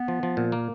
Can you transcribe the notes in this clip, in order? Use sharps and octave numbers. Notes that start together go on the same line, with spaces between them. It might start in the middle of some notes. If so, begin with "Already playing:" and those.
Already playing: B3
F3
F3
A#2
A#3